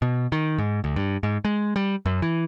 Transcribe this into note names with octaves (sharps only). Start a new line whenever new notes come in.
B2
D#3
G#2
D2
G2
G#2
G#3
G3
F#2
E3